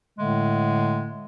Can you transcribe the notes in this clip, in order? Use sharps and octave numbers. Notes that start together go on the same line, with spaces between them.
A2 D3 G#3 A3